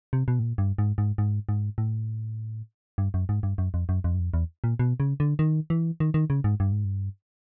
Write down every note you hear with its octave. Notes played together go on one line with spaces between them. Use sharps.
C3
B2
A2
A#2
G2
G#2
G#2
G#2
G#2
A2
G2
F#2
G#2
G2
F#2
F2
F#2
F2
F#2
F2
E2
A#2
B2
C#3
D3
D#3
E3
D#3
D#3
C#3
G#2
G2
G#2
G2